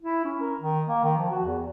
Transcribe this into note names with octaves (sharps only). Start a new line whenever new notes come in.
E4
C#4
A#4
D#3
A#3
D#3
F3
F#4
E2